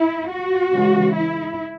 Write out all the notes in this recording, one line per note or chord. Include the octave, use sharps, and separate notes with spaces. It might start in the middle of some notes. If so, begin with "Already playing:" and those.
Already playing: E4
F#4
C#3 E3 G#3
E4